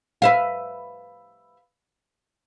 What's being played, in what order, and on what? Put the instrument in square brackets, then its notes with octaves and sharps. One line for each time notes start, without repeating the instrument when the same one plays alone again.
[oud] B4 E5 F5